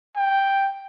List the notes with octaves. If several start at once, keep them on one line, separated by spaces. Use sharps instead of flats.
G5